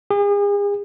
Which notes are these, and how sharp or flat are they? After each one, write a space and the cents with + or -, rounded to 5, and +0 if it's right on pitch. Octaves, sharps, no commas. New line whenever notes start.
G#4 -40